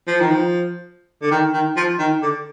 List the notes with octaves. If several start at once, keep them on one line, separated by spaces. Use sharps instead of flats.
F3
D#3
F3
D3
D#3
D#3
F3
D#3
D3